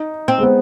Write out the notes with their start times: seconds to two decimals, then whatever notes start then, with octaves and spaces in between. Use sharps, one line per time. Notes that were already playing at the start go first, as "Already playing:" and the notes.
Already playing: D#4
0.28 C4
0.38 G#3
0.43 B3